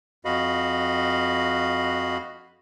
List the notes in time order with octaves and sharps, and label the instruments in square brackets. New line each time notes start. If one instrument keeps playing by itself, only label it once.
[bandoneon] F2 F#4 D#5 F5 B5